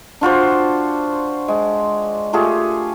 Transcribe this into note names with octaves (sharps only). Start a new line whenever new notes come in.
D4 F4 F#4 C5
G#3
A3 F4 G4 G#4